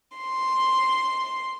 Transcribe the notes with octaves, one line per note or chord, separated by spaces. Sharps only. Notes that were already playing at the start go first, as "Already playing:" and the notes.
C6